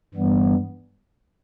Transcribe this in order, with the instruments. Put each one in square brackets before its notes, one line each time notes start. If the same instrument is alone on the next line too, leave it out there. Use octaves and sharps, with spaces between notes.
[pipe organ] G2 E3 G3 B3